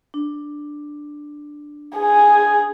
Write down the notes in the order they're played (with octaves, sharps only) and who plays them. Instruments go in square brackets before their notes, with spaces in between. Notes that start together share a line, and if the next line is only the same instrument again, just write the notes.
[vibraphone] D4
[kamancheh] G#4 [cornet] G#5